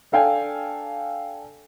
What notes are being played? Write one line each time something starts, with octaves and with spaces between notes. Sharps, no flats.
D4 A4 F5 G5 G#5